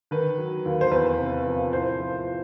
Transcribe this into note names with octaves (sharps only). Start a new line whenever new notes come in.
D#3 B4
F#3
D#2
C5
E2 B4
C3
F3
A2 C5
F3